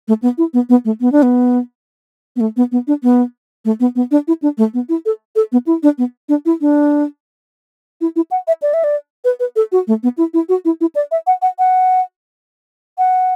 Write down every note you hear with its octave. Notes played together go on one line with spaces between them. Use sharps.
A3
B3
E4
B3
B3
A3
B3
D4
B3
B3
A3
B3
B3
D4
B3
A3
B3
B3
D4
E4
D4
A3
B3
E4
A4
A4
B3
E4
D4
B3
D4
E4
D4
E4
E4
F#5
E5
D5
E5
D5
B4
B4
A4
F#4
A3
B3
E4
E4
F#4
E4
E4
D5
E5
F#5
F#5
F#5
F#5